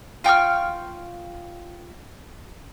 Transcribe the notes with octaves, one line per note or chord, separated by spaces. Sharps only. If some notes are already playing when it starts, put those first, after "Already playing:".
F4 G5 C#6 F6